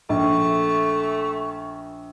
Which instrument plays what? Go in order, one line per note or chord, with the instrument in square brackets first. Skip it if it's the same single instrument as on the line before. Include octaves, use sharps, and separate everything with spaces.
[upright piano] A#1 [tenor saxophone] A3 [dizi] C#6